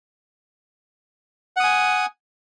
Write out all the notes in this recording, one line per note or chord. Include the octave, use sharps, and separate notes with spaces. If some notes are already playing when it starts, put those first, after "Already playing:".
F#5 G#5 D#6